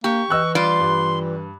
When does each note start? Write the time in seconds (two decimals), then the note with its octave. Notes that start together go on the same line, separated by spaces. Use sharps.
0.04 A#3 G4 C#6
0.30 E3 D#5 E6 F#6
0.55 G3 F4 D5 C6
0.79 G2